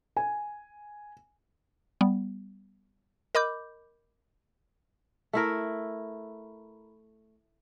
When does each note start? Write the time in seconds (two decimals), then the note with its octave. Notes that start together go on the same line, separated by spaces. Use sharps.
0.17 G#5
2.01 G3 B3
3.35 A#4 D#5 B5 D6 G6
5.33 A3 E4 A#4